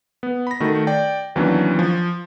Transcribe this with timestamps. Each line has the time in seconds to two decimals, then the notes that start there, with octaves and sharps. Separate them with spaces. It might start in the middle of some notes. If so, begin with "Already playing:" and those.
0.23 B3
0.47 B5 A#6
0.60 D#3 A3 F#4
0.87 D5 G5
1.36 D#2 E3 F#3 B3 C#4 D4
1.79 F3